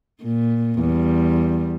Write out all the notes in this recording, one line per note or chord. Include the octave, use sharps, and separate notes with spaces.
A#2
E2 G3